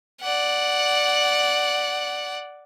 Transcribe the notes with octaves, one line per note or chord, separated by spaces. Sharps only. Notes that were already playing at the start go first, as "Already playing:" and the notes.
D5 F#5